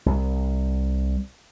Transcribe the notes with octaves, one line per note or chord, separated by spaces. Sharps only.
C2